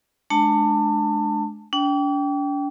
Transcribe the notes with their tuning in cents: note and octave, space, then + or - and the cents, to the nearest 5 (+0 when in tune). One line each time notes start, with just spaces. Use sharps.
G#3 +35 D4 +10 A5 +30
D4 -40 G5 -10